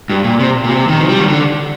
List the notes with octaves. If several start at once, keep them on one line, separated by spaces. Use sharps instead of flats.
G2
A#2
C3
A#2
C3
D#3
F3
G3
D#3
D3